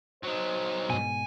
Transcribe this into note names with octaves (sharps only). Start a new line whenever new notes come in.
F#3 D#4 C5
G#2 B2 G#5